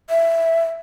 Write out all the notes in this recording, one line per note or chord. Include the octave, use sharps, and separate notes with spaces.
E5